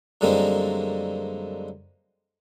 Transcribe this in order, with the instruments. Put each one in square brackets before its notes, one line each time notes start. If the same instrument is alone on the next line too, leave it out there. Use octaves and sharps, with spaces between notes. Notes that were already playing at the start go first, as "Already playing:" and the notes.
[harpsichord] F#2 D3 G3 G#3 A#3 C4